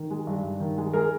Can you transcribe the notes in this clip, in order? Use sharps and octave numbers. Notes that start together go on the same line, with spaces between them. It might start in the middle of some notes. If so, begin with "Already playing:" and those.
Already playing: D#3
G#3
G2
G2
D#3
G#3
G#3 G#4 A#4